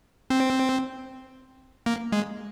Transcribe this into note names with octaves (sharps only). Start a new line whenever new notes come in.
C4
A#3
G#3